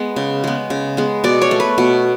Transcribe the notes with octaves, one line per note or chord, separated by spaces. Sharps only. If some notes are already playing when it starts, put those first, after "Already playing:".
Already playing: G#3 B3
C#3
G#3 B3
C#3
G#3 B3
B2 D5
C#5
A3
B4
B2